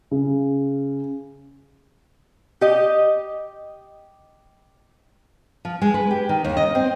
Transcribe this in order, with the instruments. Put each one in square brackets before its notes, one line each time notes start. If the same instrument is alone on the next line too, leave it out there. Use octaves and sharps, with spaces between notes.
[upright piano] C#3
[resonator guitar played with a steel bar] G4 D#5
[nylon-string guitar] F3
G#3
B4
G4
D#3
D#2
D#5
C4